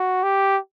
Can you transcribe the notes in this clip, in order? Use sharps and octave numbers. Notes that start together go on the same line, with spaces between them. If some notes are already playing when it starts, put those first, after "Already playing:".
Already playing: F#4
G4